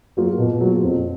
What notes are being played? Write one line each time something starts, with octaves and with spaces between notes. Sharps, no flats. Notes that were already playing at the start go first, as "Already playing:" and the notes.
F#3 A#3 F4
B2
F#3 A#3 F4
F2